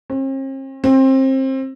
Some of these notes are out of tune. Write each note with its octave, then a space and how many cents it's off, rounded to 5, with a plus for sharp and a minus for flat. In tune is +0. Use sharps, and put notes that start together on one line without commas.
C4 +45
C4 +25